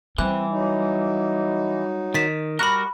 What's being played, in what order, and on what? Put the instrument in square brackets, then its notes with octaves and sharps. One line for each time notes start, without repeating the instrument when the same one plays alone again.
[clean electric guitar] E3 [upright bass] G3 [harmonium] C4 [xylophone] F#6
[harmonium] F#3 D#4
[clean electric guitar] D#3 [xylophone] A6 B6 E7
[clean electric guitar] G3 F#4 A#4 [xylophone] B5 F#6